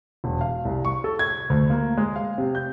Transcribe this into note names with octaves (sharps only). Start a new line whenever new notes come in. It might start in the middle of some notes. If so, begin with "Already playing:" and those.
E1
F5
C2
C#6
A4
G#6
D2
A#3
G#3
F5
C3
G6